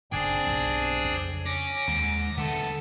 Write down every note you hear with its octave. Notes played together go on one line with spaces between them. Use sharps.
F#1 F#2 D#3 D4 G#4 C5 G5
B1 G2
F2 C#3
C#4 D6 A#6
D#2 G#2
D3 A3 B3 D4 A4